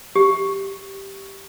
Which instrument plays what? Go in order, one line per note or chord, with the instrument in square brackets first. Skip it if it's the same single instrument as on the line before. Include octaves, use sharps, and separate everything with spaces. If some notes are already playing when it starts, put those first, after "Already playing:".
[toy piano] G4